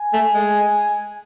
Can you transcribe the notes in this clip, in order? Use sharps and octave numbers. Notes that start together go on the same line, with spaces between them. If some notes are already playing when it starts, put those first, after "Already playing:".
Already playing: G#5
A3
G#3